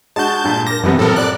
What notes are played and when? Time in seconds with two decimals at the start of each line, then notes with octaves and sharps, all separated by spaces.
0.16 G#3 D4 F#4 A5 G6
0.44 G2 A#2
0.67 A#4 D6 A#6
0.83 F#2 C3 E3 G3 B3 G5
0.99 A2 C3 F3 A4 A#4
1.16 D5 F#6